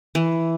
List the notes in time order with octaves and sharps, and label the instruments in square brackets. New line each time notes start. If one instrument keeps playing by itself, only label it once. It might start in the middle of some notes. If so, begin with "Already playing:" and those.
[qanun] E3